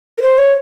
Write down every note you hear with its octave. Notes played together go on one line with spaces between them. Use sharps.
A#4
C5
C#5